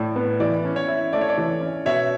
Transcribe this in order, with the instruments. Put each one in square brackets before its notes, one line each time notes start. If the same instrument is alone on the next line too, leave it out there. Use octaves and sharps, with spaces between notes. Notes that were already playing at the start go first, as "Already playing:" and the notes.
Already playing: [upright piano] A2 [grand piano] D5
[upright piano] B3
[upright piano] E3 [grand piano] D5
[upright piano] C#4
[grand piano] C#5
[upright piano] E4
[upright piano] A3 [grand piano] D5
[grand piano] C#5
D5
[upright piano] E3
C#4
[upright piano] B2 [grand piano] C#5 E5